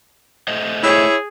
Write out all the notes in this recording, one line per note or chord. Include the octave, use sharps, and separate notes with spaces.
A3 C5 D#5
E4 G#4 C#5